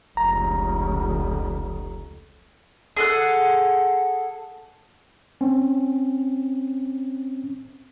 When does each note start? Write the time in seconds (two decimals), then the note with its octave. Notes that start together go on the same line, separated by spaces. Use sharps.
0.17 F1 C#2 A#5
2.97 G#4 A4 F#5
5.41 C4 C#4